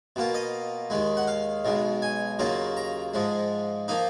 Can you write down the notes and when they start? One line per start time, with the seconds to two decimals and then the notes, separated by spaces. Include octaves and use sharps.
0.16 B2 A#3 F4
0.34 D#5
0.90 D#2 D#3 G#3
1.17 F#5
1.28 F5
1.65 B1 B2 G#3
2.02 G#5
2.39 D#2 C#3 F#3 A#3 F4
2.77 A#5
3.14 G#2 F3 G#3
3.88 F3 A#3 D#4